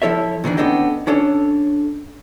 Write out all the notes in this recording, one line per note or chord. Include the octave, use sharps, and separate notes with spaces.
F3 E4 A4 C#5 E5
A#2 D#3 E3 D4
B3 C#4 D4 A4 D#5 G5
C#4 D4 A4 C#5